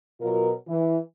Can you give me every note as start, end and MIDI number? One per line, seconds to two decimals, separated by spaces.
0.21 0.51 47
0.21 0.51 54
0.21 0.51 65
0.21 0.51 70
0.68 0.97 52